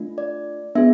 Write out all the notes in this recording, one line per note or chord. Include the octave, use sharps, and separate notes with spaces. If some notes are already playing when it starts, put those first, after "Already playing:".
Already playing: A3 D4 F4
D5
B3 D4 F4 G#4 E5